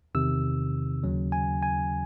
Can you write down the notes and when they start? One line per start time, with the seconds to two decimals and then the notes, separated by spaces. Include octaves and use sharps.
0.15 E2 C3 D#3 E6
1.03 D#2 C#3 F#3 C#4
1.32 G#5
1.63 G#5